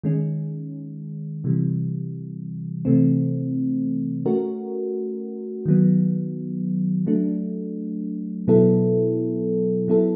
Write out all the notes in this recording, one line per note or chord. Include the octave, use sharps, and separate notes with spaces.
D#3 G#3 C#4
C3 E3 G3
C3 E3 A3 C4
A3 C#4 F#4 A#4
D#3 F#3 B3
F#3 A3 D4
B2 F#3 B3 E4 A4
F#3 B3 E4 A4